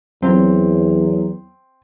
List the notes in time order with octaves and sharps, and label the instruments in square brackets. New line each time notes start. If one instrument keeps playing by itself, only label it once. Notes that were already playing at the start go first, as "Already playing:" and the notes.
[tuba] E2 [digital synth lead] F#3 [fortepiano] C4